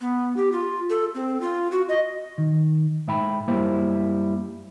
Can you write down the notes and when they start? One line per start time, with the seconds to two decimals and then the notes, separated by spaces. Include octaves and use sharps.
0.01 B3
0.37 G4
0.52 F4
0.90 A4
1.14 C4
1.41 F4
1.71 F#4
1.89 D#5
2.38 D#3
3.08 G#2 E5 G5 B5
3.48 F#2 G3 A#3 E4 C5